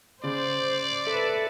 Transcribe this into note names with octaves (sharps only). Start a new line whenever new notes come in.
C#3 C5 D5
A4 B4 E5